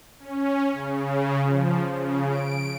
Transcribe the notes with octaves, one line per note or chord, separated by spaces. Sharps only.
C#4
C#3
F3
C#3
D7